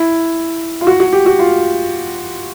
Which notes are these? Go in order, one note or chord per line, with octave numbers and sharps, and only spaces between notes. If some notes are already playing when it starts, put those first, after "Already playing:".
Already playing: E4
F4
F#4
F#4
G4
F#4
F4